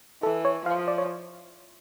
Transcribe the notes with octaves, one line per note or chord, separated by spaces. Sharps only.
E3 A4
C#5
F3 F5
D5
C#5